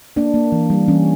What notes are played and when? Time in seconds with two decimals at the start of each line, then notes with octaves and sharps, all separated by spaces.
0.16 A#3 D4
0.34 A#3
0.52 E3
0.70 G3
0.88 E3 C#4